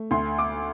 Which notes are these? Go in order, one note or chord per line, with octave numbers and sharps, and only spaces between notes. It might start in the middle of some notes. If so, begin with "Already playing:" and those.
Already playing: A3
D2 C6
D6